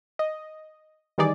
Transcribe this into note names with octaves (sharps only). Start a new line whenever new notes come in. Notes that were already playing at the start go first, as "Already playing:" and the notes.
D#5
D#3 E3 G3 D#4 G#4 D5